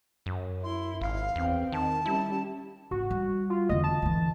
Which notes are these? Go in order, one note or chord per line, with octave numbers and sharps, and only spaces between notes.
F#2
E4 C6
G#1 F5
E2 C4
D#3 A5
G3 C#4 E4
G#1 F#4
G3
F4
E2 D3 D#5
A5
D3 E3